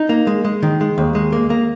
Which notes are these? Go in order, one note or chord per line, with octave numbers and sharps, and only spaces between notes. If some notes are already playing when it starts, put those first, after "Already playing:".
Already playing: D#4
A#3
G#3
G#3
D#3
G#3
D#2
G#3
A#3
A#3